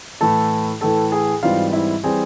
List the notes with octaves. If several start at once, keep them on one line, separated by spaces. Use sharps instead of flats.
A2 E3 A3 A4 A5
A2 E3 A3 A4 A5
G#4 G#5
G#2 E3 G3 C4 F4 F5
E4 E5
E3 G3 C4 G#4 G#5